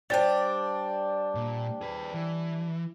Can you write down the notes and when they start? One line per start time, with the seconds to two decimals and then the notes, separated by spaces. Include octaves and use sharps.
0.10 G3 D4 C5 G5 A6
1.35 A#2
1.81 G#4 B4
2.14 E3